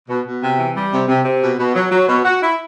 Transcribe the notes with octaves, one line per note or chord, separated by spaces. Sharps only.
B2
B2
C3
E3
G3
C3
C3
C3
B2
B2
F#3
F#3
B2
F#4
E4